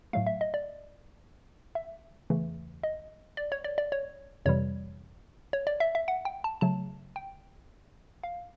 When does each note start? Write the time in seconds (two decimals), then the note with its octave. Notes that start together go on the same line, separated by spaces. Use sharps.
0.13 A2 F#3 A3 F5
0.26 E5
0.41 D#5
0.54 D5
1.75 E5
2.30 E2 C#3 E3 A3
2.83 D#5
3.37 D5
3.52 C#5
3.64 D5
3.78 D5
3.92 C#5
4.46 F2 C3 E3 G3 C#5
5.53 C#5
5.67 D5
5.80 E5
5.95 E5
6.08 F#5
6.25 G5
6.44 A5
6.61 C#3 F#3 A3 A5
7.16 G5
8.23 F5